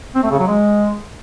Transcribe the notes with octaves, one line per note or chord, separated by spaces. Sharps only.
C4
A3
C#3
F#3
G#3